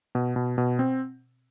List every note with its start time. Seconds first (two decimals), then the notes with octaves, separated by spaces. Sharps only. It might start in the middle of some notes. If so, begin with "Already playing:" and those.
0.15 B2
0.36 B2
0.58 B2
0.79 C4